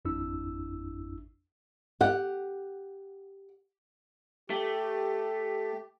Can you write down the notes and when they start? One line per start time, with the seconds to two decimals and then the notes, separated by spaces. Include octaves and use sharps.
0.05 G#1 F2 D4 E4 E6
2.01 G4 F#5
4.50 A3 G4